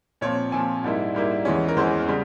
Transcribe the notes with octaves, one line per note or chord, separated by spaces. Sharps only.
A#2 F3 C4 C#5
A#2 F3 C4 G#5
G#2 G3 A#3 E4
G#2 G3 A#3 E4
E2 E3 G#3 C#4
A#4
E2 E3 G#3 C#4 C5
C#3 G3